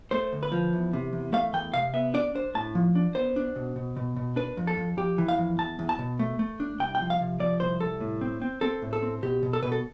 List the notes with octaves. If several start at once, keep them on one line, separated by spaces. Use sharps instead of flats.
A3 C5
D2
B4
F3
E2
C3
E2
A3 F5
E2 G5
C3 F5
B3 E5
D4 D5
D4 C5
A2 A5
F3
D4
B3 C5
D4
B2
B2
B2
B2
D4 B4
F2
A4
F2
F2 G4
E3
F5
F2
E2 A5
E2
A5
B2
A3
A3
D4
C2 G5
G5
F3
F5
C3
F3 D5
C2 C5
C2 A4
A2
C4
C4
C4 A4
A2
A4
C4
B2 G4
B2
A4
B2 B4
A4